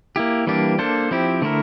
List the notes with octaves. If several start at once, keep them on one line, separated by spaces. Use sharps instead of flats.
A#3 E4 G4
E3 G3 A#3 D4 G4
A#3 D4 A4 C5
F3 C4 E4 G4
D3 A3 E4 A#4